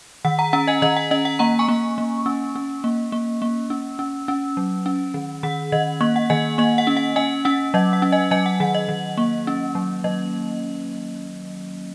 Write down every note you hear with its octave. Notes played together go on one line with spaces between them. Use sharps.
D#3 F#5
F#5 A#5
C#4 F#5 A#5
D#5 G#5
D#3 D#5
F#5
C#4 D#5
F#5
A#3 F#5 A#5
G#5 C#6
A#3
A#3
C#4
C#4
A#3
A#3
A#3
C#4
C#4
C#4
F#3
C#4
D#3
D#3 F#5
D#3 D#5
A#3 D#5
F#5
D#3 D#5 G#5
A#3 D#5
F#5
C#4
F#5
C#4 D#5 G#5
C#4 F#5
F#3 D#5
F#5
C#4
D#5 G#5
F#3 D#5 G#5
F#5
D#3 F#5
D#5
D#3
A#3
C#4
F#3
F#3 D#5